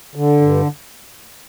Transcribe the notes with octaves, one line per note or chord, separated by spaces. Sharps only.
D3
G2